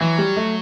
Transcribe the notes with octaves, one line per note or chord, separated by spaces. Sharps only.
E3 F#3
G3
A3